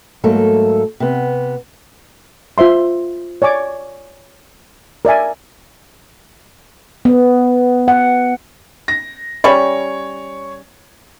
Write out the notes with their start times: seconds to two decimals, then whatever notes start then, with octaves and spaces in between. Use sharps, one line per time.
0.24 G#2 F#3 A3 A#3 A4
1.00 C3 B3
2.58 F4 C5 E5 C6
3.42 C#5 D5 G#5 D6
5.05 A#4 D5 E5 G#5
7.05 B3
7.88 F#5
8.88 A#6
9.44 G3 C#4 C#5 B5